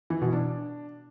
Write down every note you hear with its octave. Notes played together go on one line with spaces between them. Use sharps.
E3
B2
D4